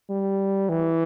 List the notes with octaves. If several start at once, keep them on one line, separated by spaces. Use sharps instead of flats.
G3
E3